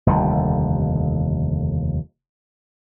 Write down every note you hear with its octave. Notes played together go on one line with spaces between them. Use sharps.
F1 D#2 D3 G3